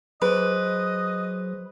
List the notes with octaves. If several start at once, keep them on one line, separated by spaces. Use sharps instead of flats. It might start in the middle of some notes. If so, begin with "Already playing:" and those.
F#3 G#4 B4 C5 D#5